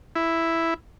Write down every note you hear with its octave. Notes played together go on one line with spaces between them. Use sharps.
E4